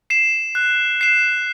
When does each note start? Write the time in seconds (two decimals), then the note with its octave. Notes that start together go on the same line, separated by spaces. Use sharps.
0.10 C7 E7
0.55 F#6
1.01 C7 E7